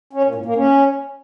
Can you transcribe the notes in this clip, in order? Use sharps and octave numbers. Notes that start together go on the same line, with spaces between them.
C#4
A#2
A2
A#3
C#4